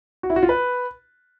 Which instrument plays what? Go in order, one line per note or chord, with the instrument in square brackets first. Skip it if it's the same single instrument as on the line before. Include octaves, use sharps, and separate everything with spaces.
[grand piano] F#4
E4
F#4
F4
B4